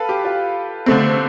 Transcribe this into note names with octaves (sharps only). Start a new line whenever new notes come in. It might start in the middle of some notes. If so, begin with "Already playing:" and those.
Already playing: A4 B4 F5
G4
F4
D3 A3 C4